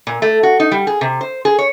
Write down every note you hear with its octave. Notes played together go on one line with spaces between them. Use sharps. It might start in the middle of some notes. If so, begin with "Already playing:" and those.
A#2
A3
F#4
D#4
G3
G#4
C3
C5
G#4
C#5